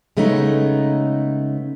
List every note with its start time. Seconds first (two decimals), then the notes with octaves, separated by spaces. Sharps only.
0.17 C#3 G#3 A3 B3 C#4 D#4